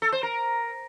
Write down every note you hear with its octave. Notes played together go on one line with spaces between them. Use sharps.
A4
C5
A#4